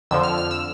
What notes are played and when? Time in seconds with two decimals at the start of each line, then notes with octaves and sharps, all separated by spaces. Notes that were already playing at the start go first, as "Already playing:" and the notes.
0.11 F2 D3 F3 E6
0.23 F6
0.38 F6
0.51 E6